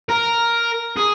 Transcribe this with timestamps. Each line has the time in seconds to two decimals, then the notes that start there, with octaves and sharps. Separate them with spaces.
0.09 A#4
0.97 G#4